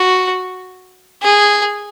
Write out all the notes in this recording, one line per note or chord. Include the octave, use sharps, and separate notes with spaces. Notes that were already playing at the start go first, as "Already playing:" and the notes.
Already playing: F#4
G#4